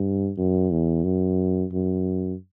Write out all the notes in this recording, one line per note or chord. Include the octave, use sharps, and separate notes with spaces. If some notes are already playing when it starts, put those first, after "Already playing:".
Already playing: G2
F#2
E2
F#2
F#2